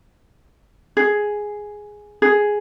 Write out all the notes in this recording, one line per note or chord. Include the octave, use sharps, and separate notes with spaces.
G#4
G#4